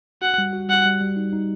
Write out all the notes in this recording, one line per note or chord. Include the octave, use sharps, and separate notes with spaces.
F#4 F#5
G3
F#4
G3 F#5
G3
G3
D#4
D#4